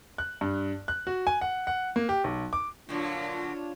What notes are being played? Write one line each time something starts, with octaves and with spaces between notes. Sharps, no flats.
F#6
G2
F#6
F#4
G#5
F#5
F#5
A#3
G4
B1
D6
A#2 D3 F#3 D4 F4 C#5